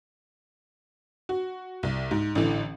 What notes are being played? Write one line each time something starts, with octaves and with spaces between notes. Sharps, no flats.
F#4
C2
G#2
A1 D3 E3